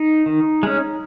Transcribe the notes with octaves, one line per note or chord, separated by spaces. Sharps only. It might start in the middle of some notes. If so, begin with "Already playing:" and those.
Already playing: D#4
D#3
G#3 C#4